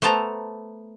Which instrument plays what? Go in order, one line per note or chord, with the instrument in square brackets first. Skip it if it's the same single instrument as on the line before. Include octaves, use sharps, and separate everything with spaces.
[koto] A3 B3 C5 A5 A#5